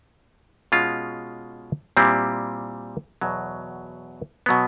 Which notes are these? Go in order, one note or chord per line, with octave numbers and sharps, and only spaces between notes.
B2 G#3 C#4 F4
A#2 G3 C4 E4
E2 B2 F#3
B2 F#3 B3